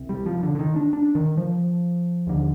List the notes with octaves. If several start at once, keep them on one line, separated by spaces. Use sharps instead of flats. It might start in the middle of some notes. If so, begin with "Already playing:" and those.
Already playing: C2 C3
G3
F3
D3
D3
D#3
D4
D4
D#3
F3
D#2 D3